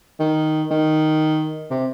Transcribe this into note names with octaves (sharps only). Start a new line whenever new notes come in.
D#3
D#3
C3